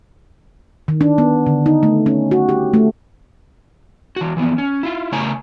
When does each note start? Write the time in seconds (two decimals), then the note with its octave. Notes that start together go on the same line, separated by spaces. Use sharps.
0.88 D#3
1.01 D4
1.18 B3
1.47 D3
1.66 D#4
1.83 A3
2.06 C#4
2.31 F#4
2.49 G4
2.74 A3
4.16 E3 F#4
4.37 E3 F3 B3
4.58 C#4
4.83 E4 F4
5.12 C#3 A3 C#5 G#5 A#5